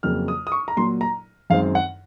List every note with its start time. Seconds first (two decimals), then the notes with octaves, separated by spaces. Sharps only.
0.03 F2 C#3 F#3 A#3 F6
0.28 D#6
0.47 D#6
0.52 C#6
0.68 A#5
0.77 A#2 F#3 A#3 C6
1.01 A#5
1.50 F#2 D#3 G#3 C4 F5
1.75 F#5